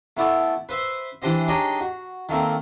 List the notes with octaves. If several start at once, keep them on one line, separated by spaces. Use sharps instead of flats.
A3 B3 E4 D5 A5
B4 C5 E5 C6
E3 D4 G4 C5 D#5
D4 D#4 G4 G#4 C#5 D#5
F#4
D#3 A3 A#3 C4